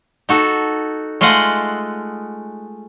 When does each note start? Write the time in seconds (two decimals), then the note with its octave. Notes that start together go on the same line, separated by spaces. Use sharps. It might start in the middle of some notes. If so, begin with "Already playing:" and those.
0.29 D#4 F#4 A4
1.21 G#3 A3 F4 D#5 F#5